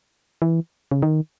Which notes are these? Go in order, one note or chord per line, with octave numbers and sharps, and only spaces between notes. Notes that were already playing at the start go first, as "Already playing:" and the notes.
E3
C#3
D#3